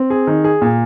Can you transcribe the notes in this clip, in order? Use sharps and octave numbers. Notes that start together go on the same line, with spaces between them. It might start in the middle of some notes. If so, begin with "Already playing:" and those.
Already playing: C4
G#4
D#3
G#4
A#2